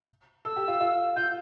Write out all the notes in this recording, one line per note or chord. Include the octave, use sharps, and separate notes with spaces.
A4 E6
G4
F4
F4
F4 G6